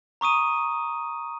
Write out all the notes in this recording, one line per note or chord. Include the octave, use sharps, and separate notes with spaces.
A#5 C#6 D#6 D#7